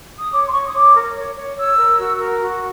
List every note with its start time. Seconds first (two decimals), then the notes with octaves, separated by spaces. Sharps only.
0.20 D#6
0.32 C#5 D6
0.47 C6
0.52 C#5 C#6
0.66 D#6
0.74 C#5 D6
0.95 A#4
1.15 C#5
1.36 C#5
1.57 C#5 E6
1.79 A#4
1.99 F#4
2.20 A#4
2.41 F#4